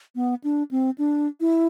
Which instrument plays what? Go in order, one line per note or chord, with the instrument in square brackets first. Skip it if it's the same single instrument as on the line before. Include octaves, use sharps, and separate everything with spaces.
[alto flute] B3
D4
C4
D4
E4